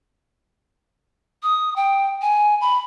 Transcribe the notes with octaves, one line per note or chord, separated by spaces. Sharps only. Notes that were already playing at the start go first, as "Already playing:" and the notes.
D#6
G5
G#5
B5